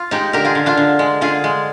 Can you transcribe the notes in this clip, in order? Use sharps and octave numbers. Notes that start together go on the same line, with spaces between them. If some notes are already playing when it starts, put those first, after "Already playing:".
Already playing: F4
G#3 D#4 G4
D3 G4 A#4
F4 G#4
D3
D4 F4
D3
G#3
D3 F4 G#4
G#3